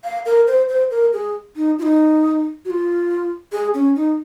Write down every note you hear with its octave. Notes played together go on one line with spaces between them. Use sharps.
F5
A#4
C5
C5
A#4
G#4
D#4
F4
D#4
F#4
F4
G#4
C#4
D#4